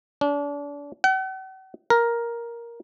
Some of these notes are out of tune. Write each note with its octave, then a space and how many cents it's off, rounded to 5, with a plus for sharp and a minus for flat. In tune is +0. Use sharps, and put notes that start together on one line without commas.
D4 -35
F#5 +45
A#4 +5